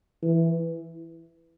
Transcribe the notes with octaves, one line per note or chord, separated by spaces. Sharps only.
E3